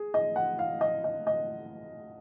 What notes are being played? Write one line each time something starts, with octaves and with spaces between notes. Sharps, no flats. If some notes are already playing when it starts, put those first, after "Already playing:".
Already playing: G#4
D#5
F#5
F5
D#5
D#5
D#5